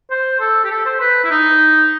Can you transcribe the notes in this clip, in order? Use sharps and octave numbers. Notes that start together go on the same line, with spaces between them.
C5
A4
G4
A4
C5
B4
E4
D#4